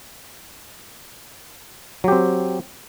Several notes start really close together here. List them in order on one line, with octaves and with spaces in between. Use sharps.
F#3 G4 C4